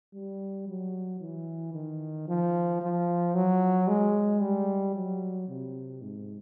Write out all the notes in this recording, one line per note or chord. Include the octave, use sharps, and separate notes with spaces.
G3
F#3
E3
D#3
F3
F3
F#3
G#3
G3
F#3
C3
G#2